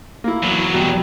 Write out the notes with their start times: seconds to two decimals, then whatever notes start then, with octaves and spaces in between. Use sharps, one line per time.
0.24 A#3 E4
0.42 E2 F#3
0.74 B2 G3